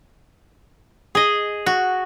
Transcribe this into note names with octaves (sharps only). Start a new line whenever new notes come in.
G#4 D#5
F#4